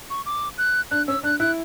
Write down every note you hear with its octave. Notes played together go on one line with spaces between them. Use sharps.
C#6
D6
F#6
D4 F#6
C#4 E6
D4 F#6
E4 F#6